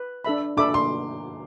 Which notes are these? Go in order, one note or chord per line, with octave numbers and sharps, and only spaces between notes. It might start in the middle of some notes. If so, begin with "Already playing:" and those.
Already playing: B4
D4 A4 E5 B5
D4 A4 E5 B5 D6
C6